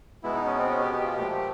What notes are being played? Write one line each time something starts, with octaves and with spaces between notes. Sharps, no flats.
B2 G#3 B3 E4
D#4
C#4
C4
C#4
G4
G4
F4
A#2 F3 A3 G4
G4